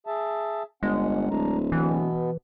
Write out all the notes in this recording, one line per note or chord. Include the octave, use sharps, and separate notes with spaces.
G#4 E5 A5
G1 G#3 C#4 F#5
D1 D4 A#5
B2 E3 B3